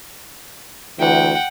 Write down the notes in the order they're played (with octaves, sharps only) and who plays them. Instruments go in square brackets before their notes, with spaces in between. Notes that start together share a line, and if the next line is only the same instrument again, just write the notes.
[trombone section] D2 E3 [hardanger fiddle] F#5 G5